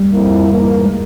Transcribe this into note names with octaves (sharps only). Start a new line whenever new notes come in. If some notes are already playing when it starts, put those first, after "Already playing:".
Already playing: G3
F2 C3 F3 A#3 E4
G#2 E3 A#3
G#3